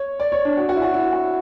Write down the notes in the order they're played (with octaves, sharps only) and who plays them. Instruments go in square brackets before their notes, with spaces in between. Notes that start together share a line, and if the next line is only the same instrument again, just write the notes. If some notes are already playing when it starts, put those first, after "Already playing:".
Already playing: [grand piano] C#5
D5
C#5
D4
F#4
F#4
E4
F#4
E4
F#4